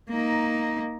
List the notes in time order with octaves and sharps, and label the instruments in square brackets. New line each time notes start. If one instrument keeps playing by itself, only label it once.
[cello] A#3 D#4